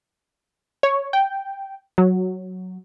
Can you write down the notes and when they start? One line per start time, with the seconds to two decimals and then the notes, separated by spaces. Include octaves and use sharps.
0.83 C#5
1.13 G5
1.98 F#3